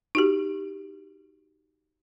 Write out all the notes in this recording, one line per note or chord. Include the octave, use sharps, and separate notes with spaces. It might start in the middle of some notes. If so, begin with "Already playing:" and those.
D#4 F#4 G4